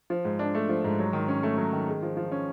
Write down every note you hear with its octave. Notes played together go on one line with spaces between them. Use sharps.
F3
G#2
D4
A3
F3
G#2
F#3
D#3
C#4
A3
F#3
D#3
G#3
F3
F3
C#4